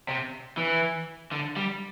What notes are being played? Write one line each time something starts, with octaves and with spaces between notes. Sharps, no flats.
C3
E3
D3
G3